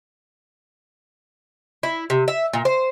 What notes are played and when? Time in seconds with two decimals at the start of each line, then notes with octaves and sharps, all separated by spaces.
1.83 E4
2.10 C3
2.28 E5
2.53 A#2
2.65 C5